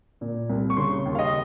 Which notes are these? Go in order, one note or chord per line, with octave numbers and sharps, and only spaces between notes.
A#2
C2
C#6
C#3 C6
D#2
F5
D#5